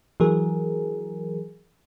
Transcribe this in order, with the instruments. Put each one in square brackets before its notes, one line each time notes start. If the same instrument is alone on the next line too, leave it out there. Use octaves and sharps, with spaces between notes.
[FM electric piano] E3 F#3 G#4 A#4